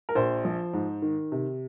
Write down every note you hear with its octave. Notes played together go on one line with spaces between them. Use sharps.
A#4
A#1 C5
F3
G#2
D#3
C3